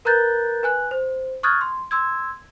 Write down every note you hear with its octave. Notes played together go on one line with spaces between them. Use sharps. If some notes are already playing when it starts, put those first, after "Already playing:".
A#4 B4 A#5 F#6 G6 A6
B4 G#5 F#6
C5
C#6 D#6 F6 F#6 G#6 A6
C6
C6 E6 G#6